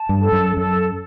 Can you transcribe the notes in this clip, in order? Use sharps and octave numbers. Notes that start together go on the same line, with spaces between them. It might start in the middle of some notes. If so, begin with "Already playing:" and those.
Already playing: A5
G2
A4
F#2
F#2 A4